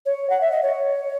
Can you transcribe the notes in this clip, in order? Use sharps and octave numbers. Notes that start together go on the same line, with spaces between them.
C#5
F#5
E5
D#5
C#5